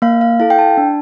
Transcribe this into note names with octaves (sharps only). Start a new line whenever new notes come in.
A#3 F5
F5
E4 A4 F5
G5
A5
D4